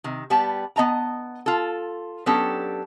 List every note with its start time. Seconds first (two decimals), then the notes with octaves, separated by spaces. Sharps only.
0.04 C3 D#3
0.30 G3 B3 G4 D5 A5
0.76 B3 D#5 A5 A#5
1.46 F4 A4
2.26 F#3 B3 C#4 D4 G4 A4